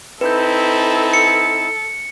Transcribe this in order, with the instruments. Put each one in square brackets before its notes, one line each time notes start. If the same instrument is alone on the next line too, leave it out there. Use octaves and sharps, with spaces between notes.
[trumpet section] C4 D#4 E4 [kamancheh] A4 [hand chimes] B4 G6
[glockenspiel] C#7